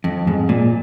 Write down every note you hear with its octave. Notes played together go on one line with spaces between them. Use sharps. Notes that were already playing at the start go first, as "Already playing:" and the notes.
F2
G#2
A#2